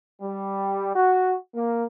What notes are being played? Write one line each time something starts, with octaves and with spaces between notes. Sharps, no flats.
G3
F#4
A#3